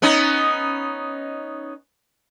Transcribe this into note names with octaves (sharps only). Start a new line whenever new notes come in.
B3 C#4 D#4